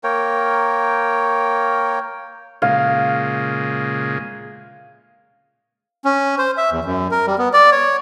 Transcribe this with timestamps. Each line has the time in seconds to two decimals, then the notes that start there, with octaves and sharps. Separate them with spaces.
0.04 A#3 A#4 C#5 G5
2.62 A#2 C#3 G#3 F5
6.05 C#4
6.38 C5
6.57 E5
6.71 E2
6.85 F#2
7.11 A#4
7.27 G3
7.38 B3
7.53 D5
7.72 C#5